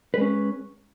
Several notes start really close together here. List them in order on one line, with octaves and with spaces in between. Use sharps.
B4 G#3 C#4